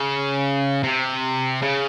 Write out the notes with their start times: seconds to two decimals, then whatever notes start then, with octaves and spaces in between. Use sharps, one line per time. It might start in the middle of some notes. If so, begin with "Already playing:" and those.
Already playing: C#3
0.83 C3
1.62 C#3